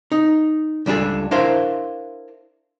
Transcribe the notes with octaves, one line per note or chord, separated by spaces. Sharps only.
D#4
C#2 G3 D4 G#4 A4
D4 E4 A#4 C5 E5 F5